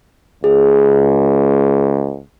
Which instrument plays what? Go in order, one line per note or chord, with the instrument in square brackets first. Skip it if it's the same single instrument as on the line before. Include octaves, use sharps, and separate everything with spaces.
[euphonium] C#2 [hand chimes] G#4